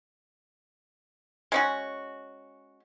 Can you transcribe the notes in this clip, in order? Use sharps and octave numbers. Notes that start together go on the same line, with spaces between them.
G#3 C#4 F#4